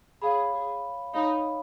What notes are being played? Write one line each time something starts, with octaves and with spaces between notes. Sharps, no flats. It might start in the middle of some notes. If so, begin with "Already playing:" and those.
G#4 C#5 F5 B5
G#4
D#4 C#5 F5 B5